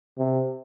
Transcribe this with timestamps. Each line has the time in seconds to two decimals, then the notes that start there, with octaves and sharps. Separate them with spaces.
0.18 C3